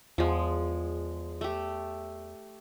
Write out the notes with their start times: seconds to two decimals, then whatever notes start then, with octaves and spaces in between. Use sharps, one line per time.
0.18 E2 F3 G#3
1.41 A3 G4